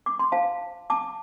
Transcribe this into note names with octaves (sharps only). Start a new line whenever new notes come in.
D6
C6
F4 C5 F5 A5
A5 D6